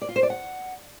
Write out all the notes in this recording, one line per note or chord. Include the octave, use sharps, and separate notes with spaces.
D5
F4
C5
D5
F#5